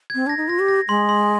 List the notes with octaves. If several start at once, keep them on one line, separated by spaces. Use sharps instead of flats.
C4 G#6
D4 A#6
D#4
F4 A#6
G4
A#6
G#3 C6
C6